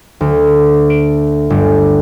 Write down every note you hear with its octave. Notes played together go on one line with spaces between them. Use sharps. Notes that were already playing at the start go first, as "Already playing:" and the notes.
D2
D7
G1